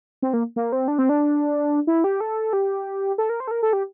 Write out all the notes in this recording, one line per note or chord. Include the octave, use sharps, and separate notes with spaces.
C4
A#3
A#3
C4
D4
C4
D4
E4
G4
A4
G4
A4
A#4
C5
A4
A#4
A4
G4